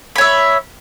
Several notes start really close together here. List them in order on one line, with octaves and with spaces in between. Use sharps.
B5 C#5 E5